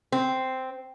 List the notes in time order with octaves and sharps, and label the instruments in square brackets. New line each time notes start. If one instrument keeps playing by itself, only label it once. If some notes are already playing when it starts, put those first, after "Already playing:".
[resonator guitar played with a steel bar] C4